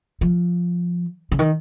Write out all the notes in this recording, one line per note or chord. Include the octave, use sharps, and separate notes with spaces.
F3
C#3
D#3